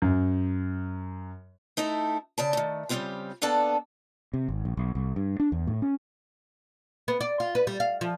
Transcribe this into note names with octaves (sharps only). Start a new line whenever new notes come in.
F#2
A3 D#4 E4 A4
C#3 D5 A5
D#3 A3
C#3 G3 A#3 C4 F4 G4
A#3 B3 D4 A4 D5 A5
C3
G#1
A#1
B1
C2
G2
D4
E2
A2
C#4
B3
D5
F4
B4
G3
F5
F3